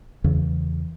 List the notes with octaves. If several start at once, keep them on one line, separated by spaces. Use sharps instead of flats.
E2 C#3 E3